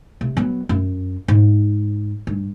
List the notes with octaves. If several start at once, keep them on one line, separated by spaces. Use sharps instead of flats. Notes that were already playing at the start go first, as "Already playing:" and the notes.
C3
F#3 B3
F#2
G#2
G2